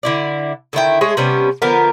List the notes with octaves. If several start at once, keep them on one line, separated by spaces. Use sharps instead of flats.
D3 E4 D5
D3 D#3 E4 G5
G#3 A3 G#4 C#5
C3 G3 B3 C#4
D3 F3 B3 A#4